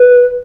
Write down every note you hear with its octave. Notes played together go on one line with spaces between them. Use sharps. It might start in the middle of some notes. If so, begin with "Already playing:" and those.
Already playing: B4